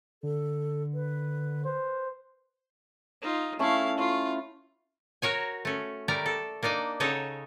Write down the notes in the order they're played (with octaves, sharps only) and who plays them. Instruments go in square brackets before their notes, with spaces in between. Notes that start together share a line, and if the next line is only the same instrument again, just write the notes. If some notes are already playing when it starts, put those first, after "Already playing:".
[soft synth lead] D3 [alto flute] A4
[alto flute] B4
[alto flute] B4 [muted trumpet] C5
[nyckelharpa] D#4 F4
[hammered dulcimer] A3 C#4 A4 [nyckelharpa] E4 F5
[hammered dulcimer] E4 [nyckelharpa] F4
[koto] F#4 A#4 C#5 G#5
A3 C#4
G3 A3 A#4 D5 A#5
A4
A#3 D4 D#4 D5 D#5
C#3 D#4 A4 C#5 F#5